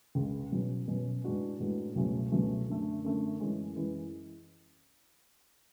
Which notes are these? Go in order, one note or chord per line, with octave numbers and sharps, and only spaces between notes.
C#2 C#3 G#3
B2 F#3 C#4
B2 F#3 C#4
A2 G#3 B3 D4 F#4
A2 G#3 B3 D4 F#4
C#2 B2 F#3 A3 C#4
C#2 B2 F#3 A3 C#4
F#2 D3 A3
F#2 D3 A3
F#2 E3 G#3 C#4
F#2 E3 G#3 C#4